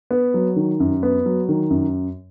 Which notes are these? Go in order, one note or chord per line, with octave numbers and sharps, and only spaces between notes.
B3
F#3
D#3
F#2
B3
F#3
D#3
F#2